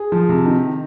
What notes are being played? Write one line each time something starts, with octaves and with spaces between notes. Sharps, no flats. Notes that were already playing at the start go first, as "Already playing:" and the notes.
Already playing: G#4
F3
C3
D#3